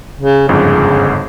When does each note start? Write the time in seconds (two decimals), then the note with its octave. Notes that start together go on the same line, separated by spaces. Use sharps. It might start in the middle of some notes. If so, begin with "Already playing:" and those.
0.19 C#3
0.49 G1 F2 G#2 C#3